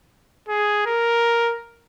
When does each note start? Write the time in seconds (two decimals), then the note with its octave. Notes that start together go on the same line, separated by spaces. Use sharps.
0.48 G#4
0.86 A#4